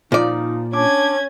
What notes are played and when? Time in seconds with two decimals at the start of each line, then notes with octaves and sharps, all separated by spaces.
0.12 A#2 F3 D#4 D5
0.73 C#4 D4 D6 G#6